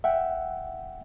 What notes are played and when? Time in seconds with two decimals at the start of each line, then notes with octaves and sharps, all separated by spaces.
0.04 E5 F#5 G5